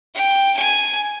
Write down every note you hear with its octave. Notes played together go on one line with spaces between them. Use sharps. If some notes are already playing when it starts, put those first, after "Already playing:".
G5
G#5